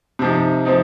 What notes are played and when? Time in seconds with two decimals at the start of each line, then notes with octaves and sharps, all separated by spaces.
0.19 C3 F3 C4 D#4
0.65 F3 C4 D#4